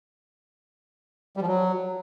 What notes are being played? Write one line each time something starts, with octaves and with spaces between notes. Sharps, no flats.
G3
F3
F#3